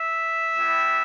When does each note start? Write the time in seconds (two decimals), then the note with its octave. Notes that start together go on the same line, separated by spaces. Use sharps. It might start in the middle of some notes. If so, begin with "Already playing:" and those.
Already playing: E5
0.56 G3 B3 E4 G4